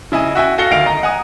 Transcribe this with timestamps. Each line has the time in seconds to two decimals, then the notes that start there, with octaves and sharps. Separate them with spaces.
0.12 C#3 E4 D#5 G#5
0.35 F#4 E5 G5 G#5
0.58 F#4 A4 F5 A#6 C#7 G7
0.71 D2 D#3 D#4 F5 D7 F7
0.86 D#5 A#5
1.03 F#5 G#5 D#6